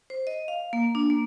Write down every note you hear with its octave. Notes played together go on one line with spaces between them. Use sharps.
C5
D#5
F5
A#3
D4
A#3